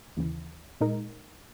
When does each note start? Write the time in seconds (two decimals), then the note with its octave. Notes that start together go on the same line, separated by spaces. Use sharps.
0.17 D#2 C#3 E3
0.81 A#2 G#3 D#4 A#4